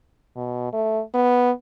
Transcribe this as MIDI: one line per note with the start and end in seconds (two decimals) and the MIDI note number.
0.36 0.71 47
0.73 1.00 57
1.14 1.51 59